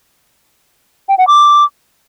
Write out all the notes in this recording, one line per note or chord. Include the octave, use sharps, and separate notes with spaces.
G5
F#5
D6